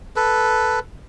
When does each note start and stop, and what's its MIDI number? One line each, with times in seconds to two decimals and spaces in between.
0.16 0.79 69
0.16 0.79 71